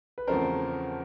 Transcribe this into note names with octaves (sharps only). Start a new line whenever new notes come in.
B4
E2 C#3 F3 A3 C4 A#4 C5